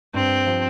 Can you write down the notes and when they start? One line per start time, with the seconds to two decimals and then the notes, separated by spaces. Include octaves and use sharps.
0.14 G2 C4
0.46 F3